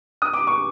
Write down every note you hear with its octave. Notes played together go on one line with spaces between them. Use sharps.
D#6
D6
C#6